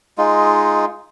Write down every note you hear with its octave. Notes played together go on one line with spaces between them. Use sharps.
G#3 D#4 F4